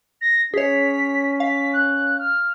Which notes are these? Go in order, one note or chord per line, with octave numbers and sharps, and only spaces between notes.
A#6
C#4 G#4 C#5 B6
F5 B6
F#6
F6